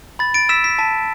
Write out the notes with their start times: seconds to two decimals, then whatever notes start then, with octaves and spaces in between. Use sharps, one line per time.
0.19 B5 A6
0.34 A6 D7
0.49 E6 B6 E7
0.64 B6
0.79 A5 B6